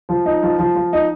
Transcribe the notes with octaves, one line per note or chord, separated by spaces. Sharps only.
F3
D#4
F3
F3
F3
D#4